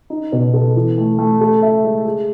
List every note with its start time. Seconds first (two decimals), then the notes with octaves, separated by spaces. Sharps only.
0.10 D#4
0.32 B2
0.54 A4
0.76 E3
0.98 A3
1.19 A3
1.41 A4
1.62 E5
1.84 G#3
2.05 G#4